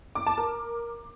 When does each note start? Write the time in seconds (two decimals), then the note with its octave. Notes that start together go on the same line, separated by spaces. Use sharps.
0.15 D6
0.27 A5
0.38 A#4